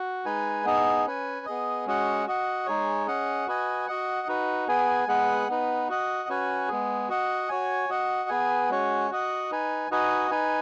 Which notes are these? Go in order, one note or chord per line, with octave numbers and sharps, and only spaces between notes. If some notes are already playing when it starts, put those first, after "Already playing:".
Already playing: F#4
G#3 D#4 B4 G#5
B3 D#4 G#4 D#5
C#4 B4 G#5
B3 G#4 D#5
G#3 C#4 F#4 D#5 F#5
F#4 D#5 F#5
G#3 D#4 G#4 C#5
C#4 G#4 D#5 F#5
F#4 B4 D#5 G#5
F#4 D#5 F#5
D#4 F#4 B4
B3 G#4 B4 G#5
G#3 B3 G#4 B4 F#5
B3 D#4 B4
F#4 D#5 F#5
C#4 F#4 B4 G#5
G#3 B3 G#4
F#4 D#5 F#5
F#4 C#5 G#5
F#4 D#5 F#5
B3 G#4 B4 G#5
G#3 C#4 F#4 C#5
F#4 D#5 F#5
D#4 B4 G#5
D#4 F#4 B4 D#5 G#5
D#4 B4 G#5